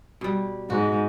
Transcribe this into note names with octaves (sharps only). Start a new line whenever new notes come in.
B2 G3
G#2 F#4